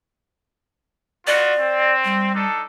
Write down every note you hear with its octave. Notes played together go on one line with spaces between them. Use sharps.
B3 F4 F#4 D5
C4
G3
D4 D#4 A4